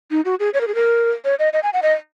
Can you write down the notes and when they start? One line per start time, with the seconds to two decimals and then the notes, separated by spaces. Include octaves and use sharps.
0.11 D#4
0.25 F#4
0.40 G#4
0.54 C#5
0.61 A#4
0.68 G#4
0.75 A#4
1.25 C#5
1.39 D#5
1.53 D#5
1.63 G#5
1.73 F#5
1.83 D#5